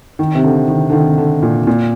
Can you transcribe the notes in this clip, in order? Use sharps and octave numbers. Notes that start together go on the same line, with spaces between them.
D#3
C3
D3
D#3
D3
D#3
D3
A#2
A#2